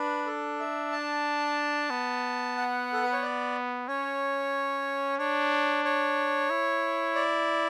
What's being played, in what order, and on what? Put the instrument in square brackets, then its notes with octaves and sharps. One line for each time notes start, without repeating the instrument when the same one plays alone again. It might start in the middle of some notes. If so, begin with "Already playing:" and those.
Already playing: [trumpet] D4 [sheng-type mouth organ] B4
[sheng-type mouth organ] A4
E5
A5
[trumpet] B3
[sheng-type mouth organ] F#5
A4
B4
C#5
D5
[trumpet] C#4 [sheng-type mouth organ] C#5
[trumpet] D4 [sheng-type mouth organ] C#5
[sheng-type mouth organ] C#5
[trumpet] E4
[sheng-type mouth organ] D5